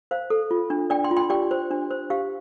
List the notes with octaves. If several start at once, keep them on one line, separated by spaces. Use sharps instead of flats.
C5 F5
A4
F4
D4
D4 D5 G5
G5 C6
F4
G5 C6
G4 D5 G5
C5
D4
C5
G4 F5